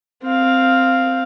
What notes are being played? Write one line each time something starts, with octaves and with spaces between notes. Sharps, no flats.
C4 F5